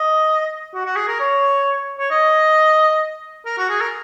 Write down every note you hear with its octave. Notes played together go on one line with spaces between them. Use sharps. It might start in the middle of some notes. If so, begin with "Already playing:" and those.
Already playing: D#5
F#4
F#4
G#4
A#4
C#5
C#5
D#5
A#4
F#4
G#4
A#4